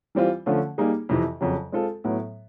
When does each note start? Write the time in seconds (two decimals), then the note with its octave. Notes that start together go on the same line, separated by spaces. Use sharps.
0.15 E3 G3 C4 F4
0.46 D3 F3 A3 C#4 F4
0.78 G3 A#3 D#4 G#4
1.09 F2 C3 E3
1.41 F2 C#3 F#3
1.72 G#3 C4 F4 A4
2.04 A2 F#3 B3